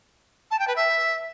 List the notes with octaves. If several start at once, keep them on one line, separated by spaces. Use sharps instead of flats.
A5
G5
B4
E5